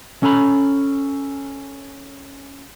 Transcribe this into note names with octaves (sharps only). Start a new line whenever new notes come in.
C#4 A4 A#5 B5